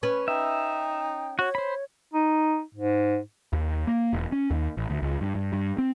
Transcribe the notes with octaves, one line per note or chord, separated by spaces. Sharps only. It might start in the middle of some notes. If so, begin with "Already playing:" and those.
C#4 B4 C#5
D#4 E5 G5
F#4 C#5
C5 B5
D#4
G#2
D#2
A#3
E1
C#4
D#2
A1
D2
C#2
G2
G2
G2
C4